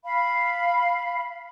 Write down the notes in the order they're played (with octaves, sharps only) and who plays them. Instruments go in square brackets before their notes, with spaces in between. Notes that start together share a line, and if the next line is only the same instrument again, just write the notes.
[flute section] F5 B5